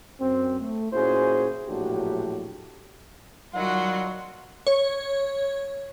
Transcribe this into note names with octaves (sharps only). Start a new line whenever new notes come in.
F#2 C4
A3
A#2 C#4 E4 F#4 G#4 C5
A#1 A2 F#3 D4 F#4 G4
D#3 F#3 G3 F4 F#4 F#5
C#5